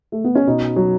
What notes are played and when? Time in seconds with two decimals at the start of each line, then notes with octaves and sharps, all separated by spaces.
0.12 A3
0.24 B3
0.35 C#4
0.47 B2 D#4
0.76 F#3